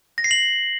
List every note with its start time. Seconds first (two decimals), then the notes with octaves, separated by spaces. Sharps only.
0.18 A#6
0.24 C7
0.31 F#7